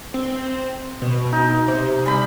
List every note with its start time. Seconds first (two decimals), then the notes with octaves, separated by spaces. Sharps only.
0.14 C4
1.02 B2
1.32 D#4
1.68 C3
2.06 G3 B5